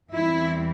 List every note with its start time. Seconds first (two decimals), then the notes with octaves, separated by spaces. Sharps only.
0.10 E2 E3 G3 C4 E4